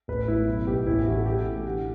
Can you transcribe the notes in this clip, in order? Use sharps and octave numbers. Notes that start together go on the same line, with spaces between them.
A1 B4
A2 E4
B1
B2 G4
A1 E4
E3 F#4
A4
E3 G4
A2
D3 F#5